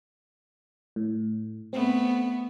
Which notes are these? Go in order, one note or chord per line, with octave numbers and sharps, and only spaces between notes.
A2
A3 B3 C4